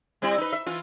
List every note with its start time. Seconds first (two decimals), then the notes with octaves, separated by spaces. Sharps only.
0.22 G3 C4 E4
0.38 D#4 B4
0.52 E5
0.67 E3 F4